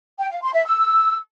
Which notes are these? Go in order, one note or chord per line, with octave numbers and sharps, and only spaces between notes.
G5
F5
C6
E5
E6